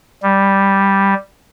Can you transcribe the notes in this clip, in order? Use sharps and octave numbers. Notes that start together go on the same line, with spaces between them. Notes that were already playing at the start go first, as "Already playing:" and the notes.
G3